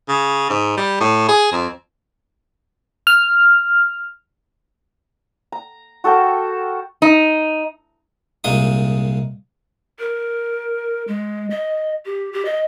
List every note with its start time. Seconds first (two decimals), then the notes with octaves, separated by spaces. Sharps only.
0.09 C#3
0.50 G#2
0.77 G3
1.01 A2
1.28 G#4
1.52 F2
3.07 F6
5.52 A#5
6.04 F#4 A4 A#4 G5
7.02 D#4
8.44 C2 A#2 G#3 D#4 D#6
9.99 A#4
11.08 G#3
11.50 D#5
12.05 G4
12.33 G4
12.45 D#5